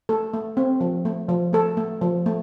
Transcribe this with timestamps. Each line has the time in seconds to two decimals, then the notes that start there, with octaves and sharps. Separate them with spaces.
0.09 A3 A4
0.33 A3
0.57 C4
0.81 F3
1.05 A3
1.29 F3
1.53 A3 A4
1.77 A3
2.01 F3
2.26 A3